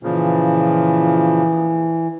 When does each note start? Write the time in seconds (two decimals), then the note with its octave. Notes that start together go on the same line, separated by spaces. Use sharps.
0.03 A#2 C#3 E3 F3